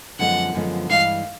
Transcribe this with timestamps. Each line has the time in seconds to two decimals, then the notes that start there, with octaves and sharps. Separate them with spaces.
0.19 F#2 D3 F3 G#3 B3 F#5
0.54 F#2 D3 F3 G#3 B3
0.90 G2 E3 G#3 F5